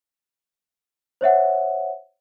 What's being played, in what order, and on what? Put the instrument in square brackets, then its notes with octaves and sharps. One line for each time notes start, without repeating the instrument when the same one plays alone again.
[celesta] C5 C#5 E5 F#5